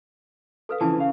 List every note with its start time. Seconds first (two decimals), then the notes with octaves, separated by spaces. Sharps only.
0.69 A4 B4 F5
0.81 C#3 E3 F3 G#5 A5
0.96 C#3 F5